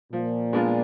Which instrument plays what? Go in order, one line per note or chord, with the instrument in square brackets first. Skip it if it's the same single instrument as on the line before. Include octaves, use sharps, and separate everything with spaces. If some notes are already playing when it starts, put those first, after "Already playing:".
[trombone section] A#2 [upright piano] F3
[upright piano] G#3 B3 D4 F4